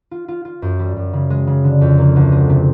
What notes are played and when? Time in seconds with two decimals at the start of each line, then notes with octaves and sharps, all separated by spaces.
0.11 F4
0.28 F4
0.45 F4
0.62 F#2
0.79 G3
0.96 F#2
1.13 C#3
1.30 G#3
1.47 C#3
1.64 D3
1.81 F2
1.98 A#3
2.16 D2
2.32 G#3
2.49 C3